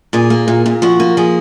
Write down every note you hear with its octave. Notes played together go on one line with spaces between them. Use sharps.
A#2 G#4
A#3
A#2
A#2
F3 F#4
A#3
F3 G#4